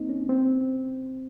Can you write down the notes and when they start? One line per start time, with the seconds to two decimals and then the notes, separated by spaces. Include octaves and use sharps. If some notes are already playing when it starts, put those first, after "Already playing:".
Already playing: A#3 C4 D#4
0.09 C#4
0.29 C4